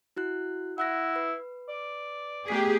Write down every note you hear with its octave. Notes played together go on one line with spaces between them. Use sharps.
E4 F#4 F#6
E4 F#5 F#6 A#6
B4
D5
A3 B3 G4 G#4 B6